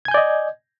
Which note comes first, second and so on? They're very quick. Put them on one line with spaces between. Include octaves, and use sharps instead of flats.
G#6 G#5 G6 D5 D#5